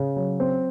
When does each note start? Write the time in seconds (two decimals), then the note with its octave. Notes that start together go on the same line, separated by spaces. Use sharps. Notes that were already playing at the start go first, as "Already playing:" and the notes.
Already playing: C#3
0.16 F#3
0.40 C4